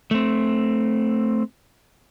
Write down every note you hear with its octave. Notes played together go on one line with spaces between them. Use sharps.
A3 C4